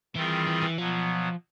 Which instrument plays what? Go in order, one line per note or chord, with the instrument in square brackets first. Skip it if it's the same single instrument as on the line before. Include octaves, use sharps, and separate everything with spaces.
[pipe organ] D#3 G3 C4 F4 G#4 [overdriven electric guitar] E3
[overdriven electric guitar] E3
E3
[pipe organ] B2 F#3 B3 [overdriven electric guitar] F3